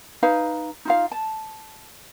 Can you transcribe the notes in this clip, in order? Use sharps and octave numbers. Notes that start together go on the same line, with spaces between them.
D#4 B4 F5
D#4 F4 F5
A5